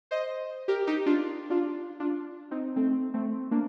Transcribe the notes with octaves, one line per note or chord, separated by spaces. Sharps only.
C5 D#5
G4 A#4
D#4 G4
D4 F4
D4 F4
D4 F4
C4 D#4
A3 C4
A3 C4
A#3 D4